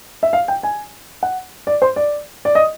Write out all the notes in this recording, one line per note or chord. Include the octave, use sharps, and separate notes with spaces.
E5
F5
G5
G#5
F#5
D5
C5
D5
D5
D#5